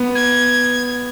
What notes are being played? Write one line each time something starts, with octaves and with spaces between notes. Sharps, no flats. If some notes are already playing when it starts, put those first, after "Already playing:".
Already playing: B3
G#6